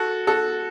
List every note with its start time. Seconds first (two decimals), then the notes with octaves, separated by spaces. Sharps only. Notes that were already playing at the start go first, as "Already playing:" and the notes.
Already playing: F#4 A4
0.27 F#4 A4